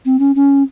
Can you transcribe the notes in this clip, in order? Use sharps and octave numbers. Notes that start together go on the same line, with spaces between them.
C4
C#4
C#4